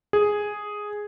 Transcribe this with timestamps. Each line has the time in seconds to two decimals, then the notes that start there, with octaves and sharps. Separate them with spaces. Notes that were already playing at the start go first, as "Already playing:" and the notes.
0.13 G#4